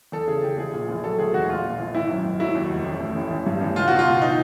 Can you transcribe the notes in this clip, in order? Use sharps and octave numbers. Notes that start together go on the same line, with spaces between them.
E2 A4
C#3 G#4
E2 G4
A#1 G#4
A#2
A#1
F#3 A4
D2 G#4
E1 F#4
A#1 F4
A#2
A#1
G#1 E4
F#2
G#1
F#3 E4
D#2
F1
A1
A2
A1
A1
G2
A1
C#2 F4
B2 F#4
F4
C#2
E3 D#4